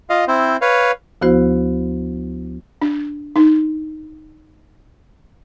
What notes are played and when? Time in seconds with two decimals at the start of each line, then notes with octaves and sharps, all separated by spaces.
0.10 F4 D#5 F5
0.28 C4 E4 C5
0.61 B4 C#5 F5
1.21 D2 F3 B3 E4 F#4 C5
2.82 D4
3.36 D#4